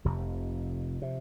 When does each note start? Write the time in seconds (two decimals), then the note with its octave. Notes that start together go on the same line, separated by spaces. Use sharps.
0.05 F1 F2 C3 F3
1.02 C3